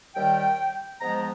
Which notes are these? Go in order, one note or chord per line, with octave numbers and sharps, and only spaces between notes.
D#2 D#3 G3 G5
G#2 F3 G#3 B3 A#5
A#5